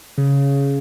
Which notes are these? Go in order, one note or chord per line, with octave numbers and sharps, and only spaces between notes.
C#3